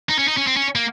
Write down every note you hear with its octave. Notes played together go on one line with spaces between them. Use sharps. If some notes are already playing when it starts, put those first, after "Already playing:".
D#4
C#4
D#4
C#4
C4
C#4
A#3